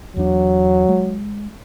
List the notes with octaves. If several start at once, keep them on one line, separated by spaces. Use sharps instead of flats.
E2 F#3 D4
G#3